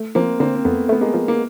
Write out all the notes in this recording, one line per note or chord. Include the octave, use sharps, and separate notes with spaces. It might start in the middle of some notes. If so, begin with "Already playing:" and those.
Already playing: A3
F3 A#3 C4
D3 A#3 C4
C4
F2 A3 B3
A3 B3
G#3 A#3
F3
A#3